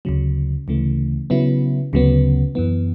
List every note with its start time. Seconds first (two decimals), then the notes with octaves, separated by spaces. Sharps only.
0.05 D2 C#3 F#3
0.68 D2 C#3 E3 A3
1.30 C#3 F#3 B3 E4
1.93 D2 C#3 F#3 B3
2.55 F#2 E3 B3